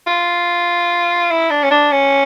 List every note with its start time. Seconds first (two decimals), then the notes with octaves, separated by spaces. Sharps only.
0.07 F4
1.30 E4
1.50 D4
1.63 C#4
1.71 D4
1.91 C#4